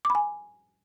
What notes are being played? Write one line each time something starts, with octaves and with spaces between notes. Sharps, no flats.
D6
B5
G#5